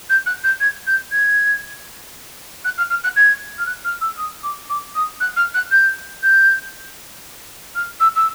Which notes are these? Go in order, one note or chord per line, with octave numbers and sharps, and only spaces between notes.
G6
F#6
G6
G#6
G6
G#6
F#6
F6
F6
F#6
G#6
F6
F#6
F6
E6
D#6
D6
D6
D#6
F#6
F6
F#6
G6
G6
F6
E6
E6